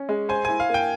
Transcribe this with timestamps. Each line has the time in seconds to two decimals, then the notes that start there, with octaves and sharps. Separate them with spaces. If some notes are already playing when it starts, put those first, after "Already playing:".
Already playing: C#4
0.09 G#3
0.29 C5 G#5
0.45 E4 G#5
0.60 F5
0.69 A#3 G5